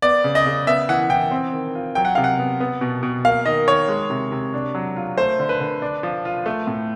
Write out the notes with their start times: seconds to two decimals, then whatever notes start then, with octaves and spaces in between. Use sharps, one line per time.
0.02 B3 D5
0.24 C#3
0.35 D#5
0.46 C#3
0.67 B3 E5
0.89 E3 F#5
1.10 E3 G5
1.31 C4
1.53 D#3
1.75 F4
1.95 F#3 G5
2.05 F#5
2.15 C3 F5
2.24 F#5
2.39 B3
2.60 B3
2.81 B2
3.03 B2
3.25 A#3 F5
3.45 D#3 D#5
3.68 D#3 C#5
3.88 G#3
4.10 C3
4.32 C3
4.54 D4
4.75 F#3
4.96 F4
5.17 A3 C5
5.39 D3
5.49 B4
5.60 D3
5.82 D4
6.03 F3
6.25 F4
6.46 A3
6.67 A2